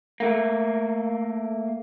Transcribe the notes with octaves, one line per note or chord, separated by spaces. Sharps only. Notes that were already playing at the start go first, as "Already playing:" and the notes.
A3 A#3